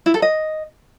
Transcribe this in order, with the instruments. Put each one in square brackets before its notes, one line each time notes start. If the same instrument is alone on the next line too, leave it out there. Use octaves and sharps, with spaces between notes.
[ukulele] E4
A4
D#5